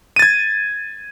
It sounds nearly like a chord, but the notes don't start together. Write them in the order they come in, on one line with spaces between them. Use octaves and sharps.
D#7 A6 G#6